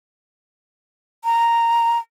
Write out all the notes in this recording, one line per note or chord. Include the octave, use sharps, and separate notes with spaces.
A#5